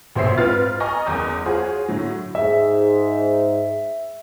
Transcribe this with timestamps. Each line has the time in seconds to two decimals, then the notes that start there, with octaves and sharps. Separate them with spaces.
0.16 A#1 B2 C5 C#5 E5 C7
0.38 G#2 C4 F4 B4 F6 A6
0.80 D#5 G#5 A#5 C#6 D#6
1.06 F#1 E2 D#6 G6
1.45 F4 F#4 G#4 C5 C#5
1.88 A2 D3 F#3
2.35 G#2 E5